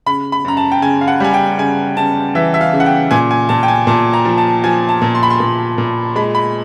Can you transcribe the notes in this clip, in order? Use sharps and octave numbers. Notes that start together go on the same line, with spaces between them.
C#3 B5
B5
F#2 A#5
A5
G5
C#3 G#5
F5
F#5
G3 G#5
G5
C#3 G#5
C#3 A5
E3 E5
E5
F5
C#3
F#5
G5
A#2 G#5
G#5
A#2 A5
G5
G#5
A#2 A5
A#5
F3
A5
F3 G#5
A5
A#2
C6
B5
C6
A#2
A#2
G#3 B5
B5